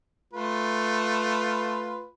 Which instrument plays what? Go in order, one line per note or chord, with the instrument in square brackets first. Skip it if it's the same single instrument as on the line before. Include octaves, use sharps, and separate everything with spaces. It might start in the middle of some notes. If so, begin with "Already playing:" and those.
[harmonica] A3 F4 B4